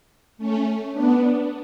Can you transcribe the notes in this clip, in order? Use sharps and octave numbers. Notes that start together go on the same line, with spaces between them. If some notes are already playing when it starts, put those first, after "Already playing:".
A3 C#4
B3 D4